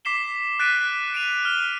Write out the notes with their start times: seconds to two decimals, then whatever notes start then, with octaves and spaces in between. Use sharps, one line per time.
0.05 D6 B6 C7 E7 G7
0.60 F#6 A6 B6 D7 D#7
1.14 D7 D#7 F7
1.45 F6 G7